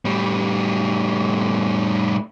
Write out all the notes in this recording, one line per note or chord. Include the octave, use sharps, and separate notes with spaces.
A2 G3